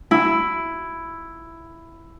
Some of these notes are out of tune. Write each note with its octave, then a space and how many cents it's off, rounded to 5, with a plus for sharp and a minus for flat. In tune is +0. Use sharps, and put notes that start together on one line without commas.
E4 +5